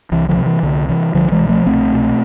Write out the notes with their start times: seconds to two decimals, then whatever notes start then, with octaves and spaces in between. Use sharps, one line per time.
0.11 C2 E3
0.29 D3 F3
0.37 C3
0.46 E3
0.63 C2 D3
0.89 C3 E3
1.14 C2 D3 F3
1.32 E3 G#3
1.40 B2
1.49 F3 A3
1.66 C2 A3 C4
1.92 B2